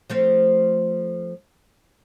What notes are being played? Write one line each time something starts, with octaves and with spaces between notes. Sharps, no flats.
F3 A3 C4